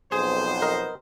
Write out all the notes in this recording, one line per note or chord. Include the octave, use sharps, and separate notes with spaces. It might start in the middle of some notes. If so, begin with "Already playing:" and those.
B1 F2 B3 G#4 C5
A#4 D#5